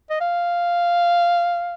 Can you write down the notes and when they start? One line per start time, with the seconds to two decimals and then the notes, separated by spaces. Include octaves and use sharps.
0.10 D#5
0.20 F5